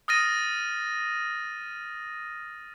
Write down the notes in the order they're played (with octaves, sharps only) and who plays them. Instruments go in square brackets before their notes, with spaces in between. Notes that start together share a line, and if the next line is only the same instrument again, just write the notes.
[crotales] D#6 F6 A6 A#6 D#7